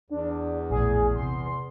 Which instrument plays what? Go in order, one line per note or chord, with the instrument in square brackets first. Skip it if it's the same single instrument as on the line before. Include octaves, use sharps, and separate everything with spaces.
[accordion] E2 [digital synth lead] D4
[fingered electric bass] A#1 A2 [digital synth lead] G#4
[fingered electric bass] C3 [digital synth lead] C6